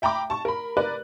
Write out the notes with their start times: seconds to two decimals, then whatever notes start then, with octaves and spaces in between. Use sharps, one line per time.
0.02 E5 G5 A#5 B5 D6
0.30 A5 C#6
0.45 A#4 B5
0.77 A#4 B4 D5 F#6